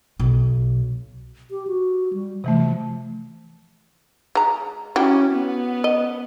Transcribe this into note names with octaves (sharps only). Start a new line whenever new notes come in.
B1
G4
F#4
G3
C3 E3 F3 A3
G#3 A#5
F#3 C#4 E4 G4
B3
D#5